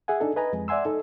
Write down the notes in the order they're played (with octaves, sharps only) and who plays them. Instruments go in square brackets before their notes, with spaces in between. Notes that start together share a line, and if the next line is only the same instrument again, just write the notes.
[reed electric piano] G#4 E5 F#5 G#5
D4 D#4 A4
B4 D#5 G#5 A#5
F2 G#3
D5 E5 F#5 G#5 C6 E6
D#4 A4